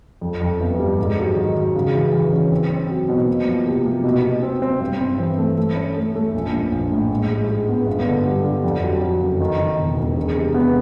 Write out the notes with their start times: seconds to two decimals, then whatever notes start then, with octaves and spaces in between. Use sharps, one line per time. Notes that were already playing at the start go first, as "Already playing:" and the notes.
0.21 F2
0.41 F2
0.60 G1
0.79 G3
0.99 G#2
1.18 F#3
1.36 D#3
1.56 F#3
1.75 C#3
1.94 E3
2.13 E3
2.33 C#4
2.52 C4
2.70 C4
2.89 F#3
3.09 B2
3.27 A#3
3.47 F3
3.67 C3
3.85 A#3
4.04 B2
4.23 B2
4.43 C4
4.62 C4
4.80 G2
5.01 C4
5.19 E3
5.38 A3
5.58 A3
5.76 C#4
5.96 A3
6.16 A3
6.34 A#1
6.53 A#1
6.72 A#1
6.92 A2
7.11 G#2
7.30 G#3
7.48 G#3
7.68 B3
7.87 G1
8.06 D3
8.26 G3
8.44 D3
8.64 F2
8.83 F#3
9.01 F#3
9.21 F#1
9.40 D#3
9.59 D#3
9.79 E1
9.97 E1
10.17 G#3
10.36 C3
10.54 B3